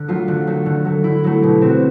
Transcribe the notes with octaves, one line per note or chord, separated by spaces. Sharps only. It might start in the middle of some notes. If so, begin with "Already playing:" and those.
Already playing: D3
F#3 A3 F4
D3
F#3 A3
D3
F#3 A3
D3 E4
F#3 A3
B2 G4
F#3 A3 C4
F#4